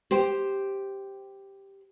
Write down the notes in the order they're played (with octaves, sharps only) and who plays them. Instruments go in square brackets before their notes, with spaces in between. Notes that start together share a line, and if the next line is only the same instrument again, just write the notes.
[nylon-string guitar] G4 C5